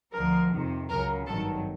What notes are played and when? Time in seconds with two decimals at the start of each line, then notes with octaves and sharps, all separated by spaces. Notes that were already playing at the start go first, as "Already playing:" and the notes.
0.14 D2 D3 F3 A#4
0.52 F2 C3 D#3
0.89 C#2 C#3 F#3 A#4
1.26 G#1 G2 D#3 F#3 A4